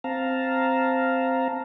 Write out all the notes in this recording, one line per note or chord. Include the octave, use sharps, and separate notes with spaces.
C4 F5 A5 A#5